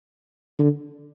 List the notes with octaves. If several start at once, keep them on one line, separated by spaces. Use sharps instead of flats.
D3